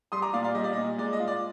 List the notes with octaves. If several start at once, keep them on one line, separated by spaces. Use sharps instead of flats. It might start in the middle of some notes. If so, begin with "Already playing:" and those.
G3 C6 D#6
A#5 D6
A#2 D5 F5
D5 F5
G3 D#5
D5
D#5
A#2
G#3 D5
D#5
F4
D5